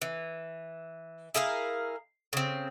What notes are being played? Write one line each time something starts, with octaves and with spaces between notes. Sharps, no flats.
E3
E4 G#4 A#4 F5
C#3 C4